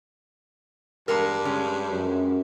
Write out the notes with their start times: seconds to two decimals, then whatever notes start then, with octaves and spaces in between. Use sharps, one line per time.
1.08 E2 G2 G#3 A#4
1.45 G#3 C#4
1.89 F#2